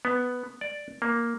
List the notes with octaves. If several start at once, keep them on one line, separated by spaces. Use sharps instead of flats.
B3
D5
A#3